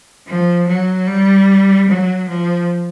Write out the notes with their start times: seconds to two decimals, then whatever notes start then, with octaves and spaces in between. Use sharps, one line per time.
0.27 F3
0.68 F#3
1.07 G3
1.89 F#3
2.29 F3